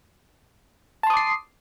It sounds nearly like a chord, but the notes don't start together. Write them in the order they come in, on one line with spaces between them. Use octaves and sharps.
A5 C6 D#6 D6 C7